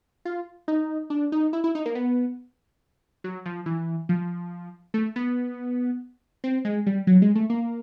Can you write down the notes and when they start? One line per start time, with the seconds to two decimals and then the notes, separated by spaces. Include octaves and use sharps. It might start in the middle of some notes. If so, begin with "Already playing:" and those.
0.25 F4
0.68 D#4
1.10 D4
1.32 D#4
1.53 E4
1.64 E4
1.75 D#4
1.86 A#3
1.95 B3
3.24 F#3
3.46 F3
3.66 E3
4.09 F3
4.94 A3
5.16 B3
6.44 C4
6.65 G#3
6.87 G3
7.07 F#3
7.22 G#3
7.35 A3
7.50 A#3